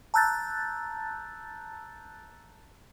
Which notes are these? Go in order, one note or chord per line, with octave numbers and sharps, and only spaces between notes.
A5 A#5 E6 F#6 G6 A6